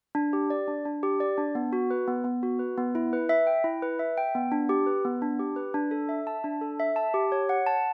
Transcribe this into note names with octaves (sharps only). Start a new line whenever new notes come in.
D4
G4
D5
D4
D4
G4
D5
D4
B3
F#4
B4
B3
B3
F#4
B4
B3
E4
B4
E5
G5
E4
B4
E5
G5
B3
D4
G4
B4
B3
D4
G4
B4
D4
A4
E5
A5
D4
A4
E5
A5
G4
C#5
F#5
A5